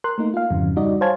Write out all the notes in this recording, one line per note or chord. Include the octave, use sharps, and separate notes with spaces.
A#4 C6 F#6
A3 A#3 D#4
F4 F5
F2 G#2 C#3 E3 F#3
G3 D#4 F#4 D5 D#5
C5 C#5 F5 G#5 A5 G#6